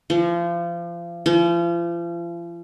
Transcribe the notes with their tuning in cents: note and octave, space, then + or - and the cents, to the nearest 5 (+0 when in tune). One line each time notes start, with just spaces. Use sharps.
F3 -30
F3 -40